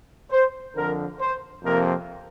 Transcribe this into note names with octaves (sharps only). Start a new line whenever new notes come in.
C5
F2 D3 F3 A#4
C5
F2 C3 F3 A#3 A#4